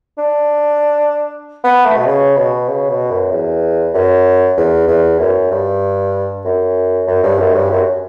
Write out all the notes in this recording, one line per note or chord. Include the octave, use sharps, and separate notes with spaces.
D4
B3
A3
B2
C#3
B2
C#3
B2
F#2
E2
F#2
E2
E2
F#2
G2
F#2
F#2
G2
F#2
G2
F#2